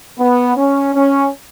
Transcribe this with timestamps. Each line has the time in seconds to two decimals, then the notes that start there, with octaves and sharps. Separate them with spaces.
0.19 B3
0.57 C#4
0.95 C#4